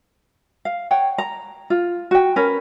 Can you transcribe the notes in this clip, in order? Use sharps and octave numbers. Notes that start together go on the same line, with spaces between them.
F5
C#5 F#5 G5
A#5
F4
F#4 G5
C#4 A#4 B4